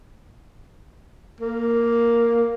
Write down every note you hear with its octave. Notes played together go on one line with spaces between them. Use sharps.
A#3